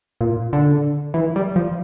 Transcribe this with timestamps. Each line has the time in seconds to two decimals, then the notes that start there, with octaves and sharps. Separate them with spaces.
0.21 A#2
0.53 D3
1.14 E3
1.36 G3
1.56 F3